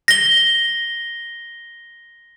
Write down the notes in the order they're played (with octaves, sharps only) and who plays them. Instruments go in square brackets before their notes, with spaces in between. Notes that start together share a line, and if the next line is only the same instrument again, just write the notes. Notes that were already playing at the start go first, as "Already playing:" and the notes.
[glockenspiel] A#6 G7